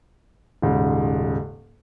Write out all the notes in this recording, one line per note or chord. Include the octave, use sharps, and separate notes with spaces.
D#1 G#2 C#3